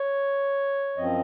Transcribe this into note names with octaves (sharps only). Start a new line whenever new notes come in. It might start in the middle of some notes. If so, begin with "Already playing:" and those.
Already playing: C#5
F#2 F3 C4 D#5